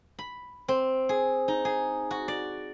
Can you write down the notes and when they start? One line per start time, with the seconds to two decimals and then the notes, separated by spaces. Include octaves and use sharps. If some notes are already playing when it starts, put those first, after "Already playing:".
0.19 B5
0.68 C4
1.09 G#4
1.48 D#4
1.65 G#4
2.11 F#4
2.28 D5